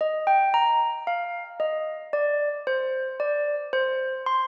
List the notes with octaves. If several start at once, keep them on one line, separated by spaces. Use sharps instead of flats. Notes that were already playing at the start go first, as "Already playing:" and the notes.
D#5
G5
A#5
F5
D#5
D5
C5
D5
C5
C6